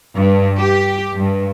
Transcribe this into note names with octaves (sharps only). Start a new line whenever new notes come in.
G2
G4
G2